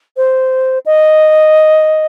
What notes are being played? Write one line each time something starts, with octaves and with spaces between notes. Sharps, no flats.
C5
D#5